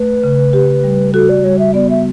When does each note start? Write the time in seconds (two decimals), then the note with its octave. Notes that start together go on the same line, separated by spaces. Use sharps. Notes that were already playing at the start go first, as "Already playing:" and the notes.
Already playing: A3 B4
0.24 C#3
0.53 G4
0.84 G3
1.14 F#4 A4
1.29 D5
1.44 G3 C#5
1.59 E5
1.74 B3 D5
1.90 E5